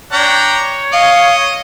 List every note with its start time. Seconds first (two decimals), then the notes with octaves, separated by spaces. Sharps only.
0.13 D4 C#5 G5 A#5
0.93 D#5 F5